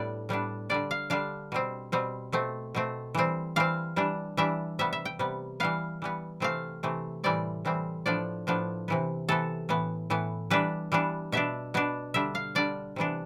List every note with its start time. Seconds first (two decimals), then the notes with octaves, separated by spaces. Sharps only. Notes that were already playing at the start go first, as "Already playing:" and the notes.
Already playing: A2 G3 B3 D4 D5
0.29 A2 G3 B3 D4
0.69 D3 G3 D4 D5
0.91 F5
1.10 D3 G3 D4 F5
1.52 B2 G3 C4
1.92 B2 G3 C4
2.32 B2 A3 C4
2.75 B2 A3 C4
3.15 E3 G3 C4
3.56 E3 G3 C4 F5
3.96 E3 G3 D4
4.37 E3 G3 D4 E5
4.79 C3 G3 B3 E5
4.93 E5
5.05 G5
5.19 C3 G3 B3
5.60 E3 G3 B3 F5
6.02 E3 G3 B3
6.40 C3 E3 A3 C4 F5
6.83 C3 E3 A3 C4
7.24 A2 E3 G3 C4 D5
7.65 A2 E3 G3 C4
8.06 A2 F3 B3 D4 D5
8.47 A2 F3 B3 D4
8.88 C3 E3 B3
9.29 C3 E3 B3 A4
9.69 A2 E3 B3
10.10 A2 E3 B3
10.50 E3 G3 B3 D4 B4
10.92 E3 G3 B3 D4
11.32 B2 B3 D4 E5
11.74 B2 B3 D4
12.14 D3 G3 D4 E5
12.35 F5
12.55 D3 G3 D4 D5
12.96 C3 E3 B3 D4